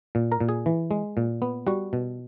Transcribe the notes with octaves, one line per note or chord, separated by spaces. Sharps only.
A#2
A#4 A#5
A#2
G#4 G#5
E3
G#3
A#2
B3
G3 F#4 F#5
B2